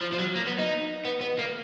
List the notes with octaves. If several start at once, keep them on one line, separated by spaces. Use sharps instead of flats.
F3
F3
F#3
A#3
B3
D#4
B3
B3
A#3